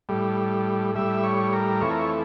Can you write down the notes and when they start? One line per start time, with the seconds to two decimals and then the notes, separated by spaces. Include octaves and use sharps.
0.09 A2 G3
0.95 A2 G3 E5
1.24 C#5
1.53 A#4
1.81 F2 E3 A3 C#5
1.91 A#4
1.99 C#5